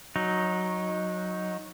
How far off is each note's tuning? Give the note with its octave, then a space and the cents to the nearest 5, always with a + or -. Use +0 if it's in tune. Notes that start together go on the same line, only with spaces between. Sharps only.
F#3 -15 D#4 +0